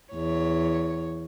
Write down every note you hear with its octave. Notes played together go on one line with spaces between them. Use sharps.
E2 C#5